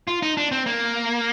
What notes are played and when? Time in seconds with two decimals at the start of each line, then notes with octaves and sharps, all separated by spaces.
0.08 F4
0.23 D#4
0.37 D4
0.52 C4
0.66 A#3